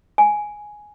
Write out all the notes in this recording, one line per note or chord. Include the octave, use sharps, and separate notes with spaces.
G#5